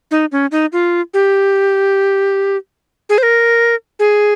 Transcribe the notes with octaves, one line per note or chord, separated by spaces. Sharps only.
D#4
C#4
D#4
F4
G4
G#4
C5
A#4
G#4